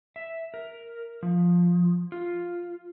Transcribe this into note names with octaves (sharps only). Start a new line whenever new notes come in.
E5
A#4
F3
F4